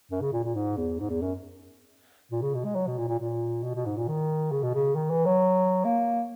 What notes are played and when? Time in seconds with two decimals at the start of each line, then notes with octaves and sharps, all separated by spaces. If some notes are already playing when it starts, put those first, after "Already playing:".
0.11 F#2
0.22 C#3
0.33 A#2
0.44 A#2
0.55 G#2
0.77 E2
1.00 G#2
1.10 E2
1.22 F#2
2.31 A#2
2.42 C#3
2.54 B2
2.65 G#3
2.75 F#3
2.87 B2
2.98 A#2
3.09 A#2
3.20 A#2
3.63 B2
3.75 B2
3.86 G#2
3.97 A#2
4.08 D#3
4.52 C#3
4.63 B2
4.74 C#3
4.96 D#3
5.10 E3
5.26 F#3
5.85 A#3